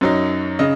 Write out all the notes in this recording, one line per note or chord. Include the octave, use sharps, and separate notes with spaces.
F#2 F#3 D#4
C#3 D#5